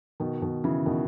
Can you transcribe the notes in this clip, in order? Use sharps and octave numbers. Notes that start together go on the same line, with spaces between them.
B2 D#3
B2 D#3
C#3 E3
B2 D#3